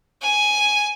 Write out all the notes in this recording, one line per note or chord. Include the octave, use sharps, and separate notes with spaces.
G#5